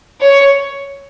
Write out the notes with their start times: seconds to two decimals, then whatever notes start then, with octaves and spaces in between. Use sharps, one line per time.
0.21 C#5